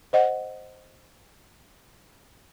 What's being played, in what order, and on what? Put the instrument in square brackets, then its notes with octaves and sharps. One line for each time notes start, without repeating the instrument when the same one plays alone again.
[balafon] C5 D#5 F#5